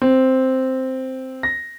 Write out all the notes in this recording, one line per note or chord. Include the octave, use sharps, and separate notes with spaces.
C4
A#6